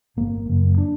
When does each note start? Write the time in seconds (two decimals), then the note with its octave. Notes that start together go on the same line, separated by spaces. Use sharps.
0.16 G1 A#3
0.47 F#2 C#3
0.78 D4